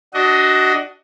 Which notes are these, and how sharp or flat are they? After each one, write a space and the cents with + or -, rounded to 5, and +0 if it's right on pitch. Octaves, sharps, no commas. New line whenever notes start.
D4 +0 F#4 +15 D#5 +20